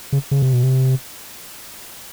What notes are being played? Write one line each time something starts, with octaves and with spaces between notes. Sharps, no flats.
C#3
C#3
C3
B2
C3